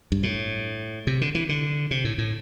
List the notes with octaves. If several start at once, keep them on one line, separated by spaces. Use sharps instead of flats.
G2
A2
C3
D3
E3
D3
C3
A2
A2